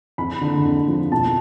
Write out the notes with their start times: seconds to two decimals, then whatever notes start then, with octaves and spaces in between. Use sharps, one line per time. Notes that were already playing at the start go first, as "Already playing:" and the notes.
0.18 F2 B5
0.41 D3
0.65 F2
0.88 F3
1.12 B2 A5